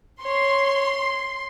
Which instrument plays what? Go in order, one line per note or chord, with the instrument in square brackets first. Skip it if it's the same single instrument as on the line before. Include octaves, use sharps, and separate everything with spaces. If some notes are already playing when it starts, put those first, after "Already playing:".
[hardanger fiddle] C#5 [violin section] C6